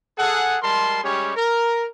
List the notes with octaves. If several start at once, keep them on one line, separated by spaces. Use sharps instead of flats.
G#4 A4 F#5
G3 G#3 A#4 A5 C6
G3 G#3 C#4 G4 G#4 C#5
A#4